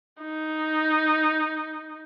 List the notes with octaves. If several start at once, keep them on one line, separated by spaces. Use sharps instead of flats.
D#4